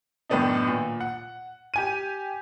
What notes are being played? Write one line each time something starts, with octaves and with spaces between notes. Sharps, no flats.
F#2 A2 D#3 B3 D4 D#4
A#2
F#5
G4 G#5 D#7